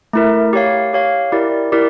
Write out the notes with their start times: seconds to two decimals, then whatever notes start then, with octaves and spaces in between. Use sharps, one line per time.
0.13 A3 E4 A#4
0.53 G4 C#5 F5
0.93 G4 C#5 F5
1.32 E4 G4 A#4 D5
1.72 E4 G4 A#4 D5